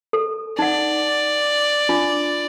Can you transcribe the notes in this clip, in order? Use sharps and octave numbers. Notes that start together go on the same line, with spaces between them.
A4
D#4 D5 F#5
D4 F4